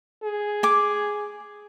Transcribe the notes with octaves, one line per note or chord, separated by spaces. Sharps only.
G#4
G#5 D6